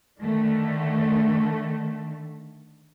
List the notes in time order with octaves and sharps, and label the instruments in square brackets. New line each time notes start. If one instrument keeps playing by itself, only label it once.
[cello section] D3 D#3 A3